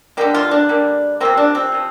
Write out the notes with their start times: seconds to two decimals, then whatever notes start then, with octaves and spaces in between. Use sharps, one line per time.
0.17 D3 G3 A#3 G4
0.35 F4
0.51 D4
0.69 D3 G3 A#3
1.20 C3 F3 A#3 C4
1.37 D4
1.55 C4
1.72 C3 F3